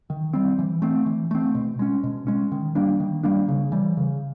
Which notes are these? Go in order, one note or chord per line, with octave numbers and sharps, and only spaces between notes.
D#3
G3 C4
E3
A3 C4
E3
A3 C4
B2
G#3 C#4
B2
G#3 C#4
D#3
G3 A#3 D4
D#3
G3 A#3 D4
C#3
E3 G3
C#3